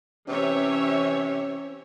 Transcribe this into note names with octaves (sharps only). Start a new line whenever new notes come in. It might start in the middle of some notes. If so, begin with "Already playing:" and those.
C3 E3 C#4 C#5 E5